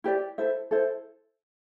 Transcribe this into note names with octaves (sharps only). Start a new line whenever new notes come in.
E4 G4 B4 D5
E4 A4 C5 E5
E4 A4 C5